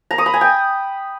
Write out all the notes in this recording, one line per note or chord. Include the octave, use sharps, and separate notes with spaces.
A#5
D#6
B5
G#5
G5